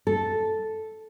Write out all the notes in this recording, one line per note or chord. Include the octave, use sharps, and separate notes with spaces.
A4